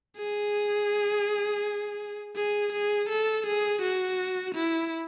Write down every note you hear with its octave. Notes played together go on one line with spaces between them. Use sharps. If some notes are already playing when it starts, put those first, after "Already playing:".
G#4
G#4
G#4
A4
G#4
F#4
E4